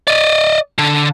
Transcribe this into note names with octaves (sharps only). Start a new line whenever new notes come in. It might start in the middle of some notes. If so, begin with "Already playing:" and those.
D5 D#5
D3